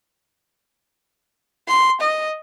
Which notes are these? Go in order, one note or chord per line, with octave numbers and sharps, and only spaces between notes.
C6
D#5